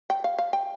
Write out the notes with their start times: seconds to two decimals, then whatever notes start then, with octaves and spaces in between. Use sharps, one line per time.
0.10 G5
0.24 F5
0.38 F5
0.53 G5